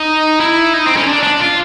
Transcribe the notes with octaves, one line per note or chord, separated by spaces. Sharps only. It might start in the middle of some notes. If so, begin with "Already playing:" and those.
Already playing: D#4
E4
D#4
C4
C#4
D4
D4
F4